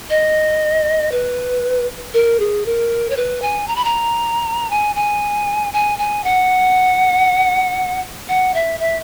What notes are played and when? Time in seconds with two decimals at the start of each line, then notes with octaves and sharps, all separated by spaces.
0.10 D#5
1.12 B4
2.14 A#4
2.40 G#4
2.66 A#4
3.10 C#5
3.17 B4
3.42 G#5
3.68 A#5
3.76 B5
3.84 A#5
4.70 G#5
4.96 G#5
5.73 G#5
5.99 G#5
6.24 F#5
8.29 F#5
8.54 E5
8.80 E5